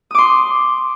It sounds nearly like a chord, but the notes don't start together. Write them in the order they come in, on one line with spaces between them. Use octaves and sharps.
D#6 D6 C6